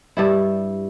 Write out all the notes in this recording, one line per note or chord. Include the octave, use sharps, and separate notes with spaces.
G2 G3 E4